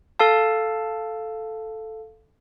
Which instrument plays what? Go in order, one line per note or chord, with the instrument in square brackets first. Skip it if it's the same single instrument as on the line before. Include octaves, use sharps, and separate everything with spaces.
[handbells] A4 F5 A5